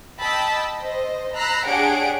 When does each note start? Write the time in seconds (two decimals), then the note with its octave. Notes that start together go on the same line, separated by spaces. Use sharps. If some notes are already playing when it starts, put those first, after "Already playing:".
0.21 D#5 G5 A5 B5 E6
0.82 C5 D#5
1.36 A#5 B5 E6 F#6 A#6 C7
1.67 D4 G4 G#4 C#5 F#5 D7